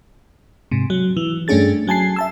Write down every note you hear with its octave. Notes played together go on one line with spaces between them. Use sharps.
G#2 C3
F#3
E3
G2 A3 C#4 D4 G#4 A6
F#3 G#5 A5 C7
E5 A5 E6